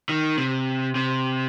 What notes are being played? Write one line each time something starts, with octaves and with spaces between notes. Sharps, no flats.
D#3
C3
C3